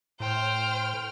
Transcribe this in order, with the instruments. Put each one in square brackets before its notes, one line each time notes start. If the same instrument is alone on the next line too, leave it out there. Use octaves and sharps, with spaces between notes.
[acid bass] A2 [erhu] C5 [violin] G5 F6